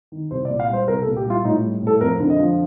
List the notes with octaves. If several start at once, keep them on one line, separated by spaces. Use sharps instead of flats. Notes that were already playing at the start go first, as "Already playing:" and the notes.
D#3
C2 C5
D5
A#2
F5
G3 C5
C2 A#4
A4
A#2
G4
G3 F4
A2 D#4
G3
A2 A4
F2 A#4
D3
D#5
F3